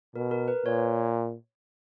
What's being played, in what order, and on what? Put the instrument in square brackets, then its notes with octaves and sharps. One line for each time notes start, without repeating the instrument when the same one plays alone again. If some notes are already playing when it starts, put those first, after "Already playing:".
[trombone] B2 [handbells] A#4
[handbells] A#4
B4
[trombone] A#2 [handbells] C#5